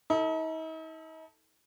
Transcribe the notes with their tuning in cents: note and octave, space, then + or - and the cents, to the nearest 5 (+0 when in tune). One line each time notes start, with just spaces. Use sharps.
D#4 +45 A4 +10